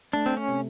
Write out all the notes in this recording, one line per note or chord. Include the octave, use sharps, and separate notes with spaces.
A3 D4
C4
C#4
C3